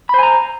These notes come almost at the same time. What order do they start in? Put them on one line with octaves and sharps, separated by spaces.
B5 C5 G#5 A#5